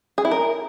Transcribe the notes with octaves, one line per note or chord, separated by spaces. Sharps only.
G#4
E4
A#4